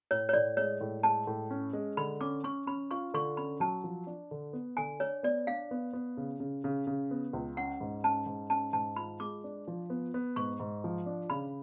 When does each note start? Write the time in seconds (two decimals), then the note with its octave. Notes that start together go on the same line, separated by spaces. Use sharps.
0.11 A2 C#5
0.29 C#5
0.33 A2 D5
0.57 G#3 C#5
0.81 A2
1.03 G#3 A5
1.27 A2
1.50 C#4
1.73 G#3
1.97 D3 B5
2.21 C#4 D6
2.44 C#4 C#6
2.67 C#4 B5
2.91 F4 C#6
3.14 D3 C#6
3.37 C#4 B5
3.60 F#3 A5
3.84 F3
4.07 D4
4.31 D3
4.53 B3
4.77 D3 G#5
5.00 D4 C#5
5.23 B3 D5
5.47 D4 F5
5.71 B3
5.93 B3
6.17 C#3
6.40 C#3
6.64 C#3
6.87 C#3
7.11 B3
7.33 C#2
7.57 C#4 F#5
7.81 G#2
8.04 C#4 A5
8.26 G#2
8.50 C#4 A5
8.73 G#2 A5
8.96 F4 B5
9.20 G#3 D6
9.44 D4
9.68 F3
9.90 B3
10.14 B3
10.36 G#2 C#6
10.60 G#2
10.84 F3
11.06 D4
11.30 C#3 B5